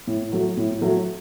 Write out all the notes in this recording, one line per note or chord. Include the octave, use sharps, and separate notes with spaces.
A2
F#3 A3
A2
F#3 A3